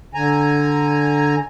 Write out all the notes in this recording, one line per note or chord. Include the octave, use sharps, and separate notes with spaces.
D3 G#5 A#5